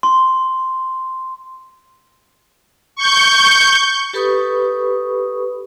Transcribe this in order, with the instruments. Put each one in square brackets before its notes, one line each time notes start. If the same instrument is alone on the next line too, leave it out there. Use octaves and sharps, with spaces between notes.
[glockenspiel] C6
[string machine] C#6 G6
[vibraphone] G4 A4 B4 B5 C#6 D#6